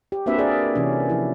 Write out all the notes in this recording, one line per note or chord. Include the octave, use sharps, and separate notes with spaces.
G4
A#3 C4 D4 F#4 B4 E5
G#4 A#4 D5
C3 E3 C#4
F3 E4